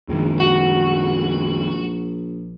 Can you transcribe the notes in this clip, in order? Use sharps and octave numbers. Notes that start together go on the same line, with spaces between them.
A#1 F#2 D#3 G#3
F#4